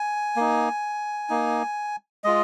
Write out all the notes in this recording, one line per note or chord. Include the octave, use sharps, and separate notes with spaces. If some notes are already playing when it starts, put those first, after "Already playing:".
Already playing: G#5
A#3 D#4
A#3 D#4
G#3 F4 D#5